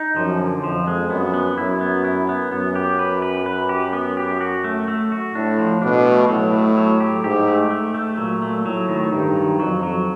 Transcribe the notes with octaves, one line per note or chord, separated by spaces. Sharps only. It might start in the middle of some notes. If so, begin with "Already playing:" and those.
Already playing: D#4
F#2 F3
D3
F2 F3
G#3
F#2 B3
B3
F#2 E4
B3
E4
B3
F#2 B3
G4
B4
B4
B4
G4
B3
G4
F#4
A3
A3
F#4
A2 D4
F3
B2 D4
A3
A2 F#3
A3
F#3
G4
G#2 G4
A3
A3
A3
A#2 F#3
A3
A2 F#3
D#3
G2 D#3
F#3
F2 F#3
F#3